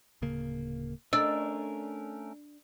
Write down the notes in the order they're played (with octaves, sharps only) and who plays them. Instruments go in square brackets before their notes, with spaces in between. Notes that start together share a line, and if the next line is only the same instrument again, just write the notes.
[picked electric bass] D1 C#3 A#3
[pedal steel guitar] A3 C#4 A#4 [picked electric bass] D4 [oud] D5 [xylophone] E6